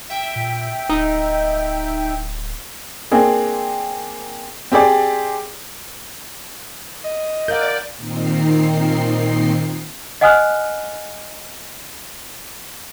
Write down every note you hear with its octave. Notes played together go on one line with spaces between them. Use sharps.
E5 G5
A#2
D1 D#4
A#3 C4 D4 G#4
C4 G4 G#4 D5
D#5
A#4 D5 F5 F#5 G6
A#2 D#3 C4 D#4 C7
D#5 F#5 G#5 D#6 F6 F#6